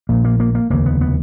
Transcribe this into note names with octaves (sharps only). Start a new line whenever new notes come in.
A#1 A#2 A#3
A#3
A#3
A#3
F1 D#2 C#3 A#3
B3
B3